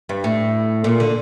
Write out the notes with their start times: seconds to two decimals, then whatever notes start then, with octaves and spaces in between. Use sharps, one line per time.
0.09 G2
0.24 A2
0.84 A#2
1.00 D3